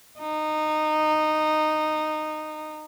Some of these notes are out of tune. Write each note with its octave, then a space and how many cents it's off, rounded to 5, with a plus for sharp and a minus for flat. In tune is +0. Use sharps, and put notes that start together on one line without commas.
D#4 -15